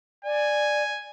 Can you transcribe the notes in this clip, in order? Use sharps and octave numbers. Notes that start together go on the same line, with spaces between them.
D5 G#5